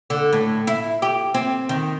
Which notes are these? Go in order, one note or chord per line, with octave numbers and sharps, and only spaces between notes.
D3
A2
E4
G4
C4
D#3